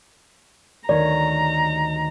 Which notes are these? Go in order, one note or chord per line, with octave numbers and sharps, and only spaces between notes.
D2 D#3 C#5 D5 A#5